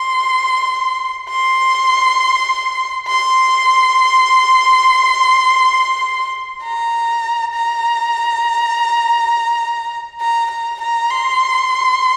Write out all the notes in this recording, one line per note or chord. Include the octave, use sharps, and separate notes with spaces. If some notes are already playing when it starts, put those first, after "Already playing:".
Already playing: C6
C6
C6
A#5
A#5
A#5
A#5
A#5
C6